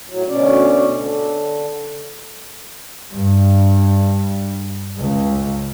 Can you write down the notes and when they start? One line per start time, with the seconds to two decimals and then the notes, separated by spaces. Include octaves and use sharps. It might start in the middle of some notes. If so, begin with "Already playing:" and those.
0.10 A2 F#3
0.28 D2 B2 C#4 D5
0.95 D3
3.12 G2
4.99 C#2